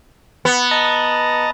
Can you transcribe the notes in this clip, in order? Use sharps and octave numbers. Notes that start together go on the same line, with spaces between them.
B3
D#5 A5 A#5